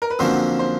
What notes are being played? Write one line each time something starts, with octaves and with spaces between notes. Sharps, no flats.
A#4
B4
F2 D3 F#3 A#3 C#4 C5
C5